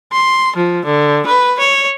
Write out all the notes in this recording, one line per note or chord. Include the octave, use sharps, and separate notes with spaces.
C6
F3
D3
B4
C#5